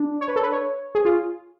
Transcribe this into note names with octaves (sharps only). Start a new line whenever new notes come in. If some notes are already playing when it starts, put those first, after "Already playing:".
Already playing: D4
C#5
B4
A4
B4
C#5
G#4
F4